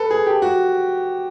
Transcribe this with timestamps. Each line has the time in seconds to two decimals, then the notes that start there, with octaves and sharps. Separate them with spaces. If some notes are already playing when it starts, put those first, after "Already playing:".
Already playing: A4 B4
0.11 G#4
0.27 G4
0.42 F#4